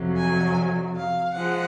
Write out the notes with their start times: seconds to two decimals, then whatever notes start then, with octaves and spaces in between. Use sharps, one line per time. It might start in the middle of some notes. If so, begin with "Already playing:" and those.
Already playing: F2 C3 F#3
0.17 G#5
0.96 F5
1.35 F3 G#3 F#5